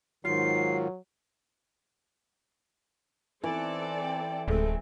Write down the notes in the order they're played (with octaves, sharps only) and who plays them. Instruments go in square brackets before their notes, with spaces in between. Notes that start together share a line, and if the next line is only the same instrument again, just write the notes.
[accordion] G#2 D#3 [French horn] F#3 [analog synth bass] F4 [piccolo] C7
[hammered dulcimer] E3 [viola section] C4 A4 D5
[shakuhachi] G5
[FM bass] D1 [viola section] G#3 A3 C4 [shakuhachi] A4